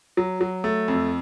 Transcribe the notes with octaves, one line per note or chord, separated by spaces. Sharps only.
F#3
F#3
A3
F2